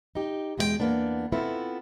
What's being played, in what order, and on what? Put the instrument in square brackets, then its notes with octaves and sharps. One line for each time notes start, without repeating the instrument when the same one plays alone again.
[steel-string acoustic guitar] D#4 G4
E2 B2 G#3 F#4 G5
E2 B2 A#3 B3 D4
B3 C4 E4 F4 A4